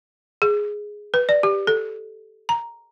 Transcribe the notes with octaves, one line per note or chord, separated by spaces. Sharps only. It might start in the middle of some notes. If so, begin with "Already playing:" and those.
G#4
B4
D5
G4
A4
A#5